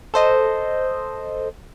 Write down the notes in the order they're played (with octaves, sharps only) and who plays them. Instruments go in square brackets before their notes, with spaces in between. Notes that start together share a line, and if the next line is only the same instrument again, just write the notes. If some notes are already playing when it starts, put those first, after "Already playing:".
[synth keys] A4 C5 D#5